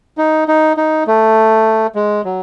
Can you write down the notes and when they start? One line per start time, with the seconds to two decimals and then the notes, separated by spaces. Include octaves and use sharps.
0.18 D#4
0.48 D#4
0.77 D#4
1.07 A3
1.95 G#3
2.25 F#3